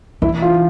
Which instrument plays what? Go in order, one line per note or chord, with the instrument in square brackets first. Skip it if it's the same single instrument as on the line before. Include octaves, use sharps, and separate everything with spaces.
[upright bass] E3 [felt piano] E4
[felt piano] F4